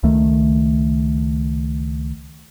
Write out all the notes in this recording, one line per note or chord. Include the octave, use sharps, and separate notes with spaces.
C#2 D#3 A3